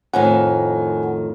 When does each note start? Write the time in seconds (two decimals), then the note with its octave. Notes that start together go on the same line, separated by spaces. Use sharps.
0.14 F2 A2 D#3 F#5 G#5